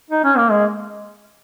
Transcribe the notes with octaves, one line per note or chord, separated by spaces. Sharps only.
D#4
C#4
A#3
G#3